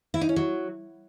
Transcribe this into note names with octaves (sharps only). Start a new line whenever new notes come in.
E4
D#4
C#4
F#3